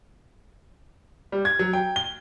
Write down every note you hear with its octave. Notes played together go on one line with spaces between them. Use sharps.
G3
G#6
F#3
G5
G7